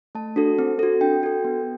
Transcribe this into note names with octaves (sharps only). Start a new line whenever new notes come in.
A3 A5
D4 F#4 A4
C4
F#4 A4
D4 G5
F#4 A4
B3